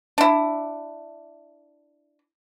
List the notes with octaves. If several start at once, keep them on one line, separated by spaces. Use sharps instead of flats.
D4 E4